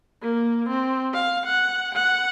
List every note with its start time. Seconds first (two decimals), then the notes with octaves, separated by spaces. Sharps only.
0.22 A#3
0.69 C4
1.14 F5
1.46 F#5
1.95 F#5